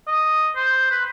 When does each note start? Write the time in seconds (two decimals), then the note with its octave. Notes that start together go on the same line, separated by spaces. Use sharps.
0.07 D#5
0.56 C5
0.91 B4